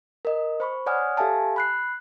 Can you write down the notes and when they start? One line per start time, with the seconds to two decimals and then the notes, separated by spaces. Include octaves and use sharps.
0.25 A#4 D#5
0.60 C5 B5 C#6
0.86 C#5 D5 F#5 G#5 D#6 F6
1.17 G4 A4 E5 F5 G#5 A5
1.56 B5 F#6 C7